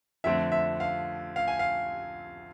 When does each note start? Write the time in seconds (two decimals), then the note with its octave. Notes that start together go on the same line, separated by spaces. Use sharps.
0.24 F2 D3 A3 C4 E5
0.52 E5
0.80 F5
1.36 F5
1.48 G#5
1.59 F5